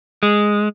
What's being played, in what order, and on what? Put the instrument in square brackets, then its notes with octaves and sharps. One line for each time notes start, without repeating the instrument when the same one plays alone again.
[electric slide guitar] G#3